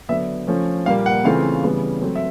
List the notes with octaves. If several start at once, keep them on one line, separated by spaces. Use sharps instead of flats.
D3 F#3 B3 D4 E5
F3 A3 C#4
A#2 G3 A#3 F5
F#5
C#3 E3 A3 C4 F4 F5
C#3 E3 G3 B3
F#3 A3 C4
E5